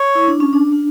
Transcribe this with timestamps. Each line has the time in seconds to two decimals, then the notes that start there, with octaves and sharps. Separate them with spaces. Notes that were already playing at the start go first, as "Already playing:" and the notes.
Already playing: C#5
0.15 E4
0.28 D4
0.40 C#4
0.53 D4
0.72 D4